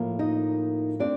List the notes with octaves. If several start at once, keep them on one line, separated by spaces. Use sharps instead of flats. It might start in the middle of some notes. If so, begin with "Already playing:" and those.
Already playing: A2 F3 A#3
D#4 D#5
A3 C4 D4 D5